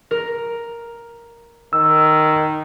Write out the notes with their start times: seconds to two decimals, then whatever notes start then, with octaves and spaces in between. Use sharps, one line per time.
0.11 A#4
1.73 D#3 E6